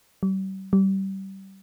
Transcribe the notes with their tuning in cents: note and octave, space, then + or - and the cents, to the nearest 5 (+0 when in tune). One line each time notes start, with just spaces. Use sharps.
G3 -40
G3 -25